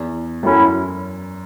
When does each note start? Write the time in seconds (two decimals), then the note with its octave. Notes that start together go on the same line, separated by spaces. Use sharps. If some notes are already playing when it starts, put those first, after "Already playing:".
Already playing: E2
0.43 F#2 A2 F#3 C#4 E4